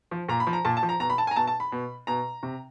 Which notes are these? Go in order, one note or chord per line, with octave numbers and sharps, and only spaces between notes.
F3
A#2 A#5
B5
F3
A#5
A#2 A5
A5
F3
A#5
B2 A#5
B5
A5
G#5
A#5
B2 A5
A5
B5
B2
B2 A#5
C3